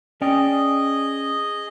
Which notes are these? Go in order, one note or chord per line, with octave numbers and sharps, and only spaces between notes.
C#4 G#4 D5 D#5 G5